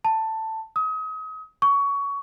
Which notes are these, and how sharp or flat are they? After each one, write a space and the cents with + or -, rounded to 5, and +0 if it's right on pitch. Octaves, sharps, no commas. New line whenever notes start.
A5 +10
D#6 +35
C#6 +20